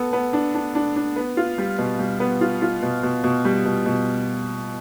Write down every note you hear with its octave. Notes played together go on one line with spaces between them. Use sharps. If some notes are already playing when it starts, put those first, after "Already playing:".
Already playing: B3 A4
B3
D4
D4
D4
D4
B3
F4
G3
B2
G3
B3
F4
F4
B2
B2
B2
G3
B2
B2